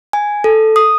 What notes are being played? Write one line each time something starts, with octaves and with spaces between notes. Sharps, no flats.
G#5
A4
D#6